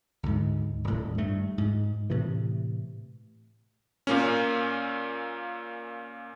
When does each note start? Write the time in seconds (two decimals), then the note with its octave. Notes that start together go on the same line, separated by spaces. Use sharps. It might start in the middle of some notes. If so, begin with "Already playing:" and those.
0.23 D2 G#2
0.84 D#1 A2
1.18 G2 A3
1.58 G#2
2.10 A2 C3 E3
4.07 A#2 A#3 C#4